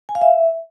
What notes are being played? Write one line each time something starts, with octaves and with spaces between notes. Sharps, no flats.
G#5
F5
E5